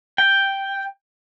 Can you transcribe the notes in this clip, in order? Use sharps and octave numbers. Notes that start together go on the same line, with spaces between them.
G5